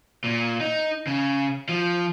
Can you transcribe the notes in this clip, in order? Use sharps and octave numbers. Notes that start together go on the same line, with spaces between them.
A#2
D#4
C#3
F3